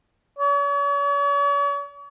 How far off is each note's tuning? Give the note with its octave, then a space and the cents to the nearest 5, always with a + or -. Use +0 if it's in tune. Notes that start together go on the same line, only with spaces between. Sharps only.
C#5 +45